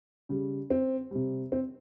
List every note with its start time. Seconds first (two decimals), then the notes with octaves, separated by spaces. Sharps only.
0.29 C#3 G3
0.70 C4
1.11 C3 G3
1.52 C4